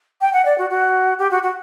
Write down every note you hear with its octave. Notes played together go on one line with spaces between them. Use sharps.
G5
F#5
D5
F#4
F#4
G4
F#4
F#4